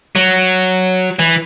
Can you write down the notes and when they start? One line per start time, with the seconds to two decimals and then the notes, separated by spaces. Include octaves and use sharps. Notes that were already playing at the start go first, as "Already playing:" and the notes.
0.15 F#3
1.19 E3